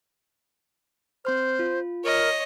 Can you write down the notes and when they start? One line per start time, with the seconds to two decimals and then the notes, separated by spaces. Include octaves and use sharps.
1.25 C4 C5 C6 F6
1.59 F4
2.04 A#4 C#5 D#5